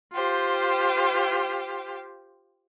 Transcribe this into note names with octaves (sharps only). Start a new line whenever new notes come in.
F4 G4 C5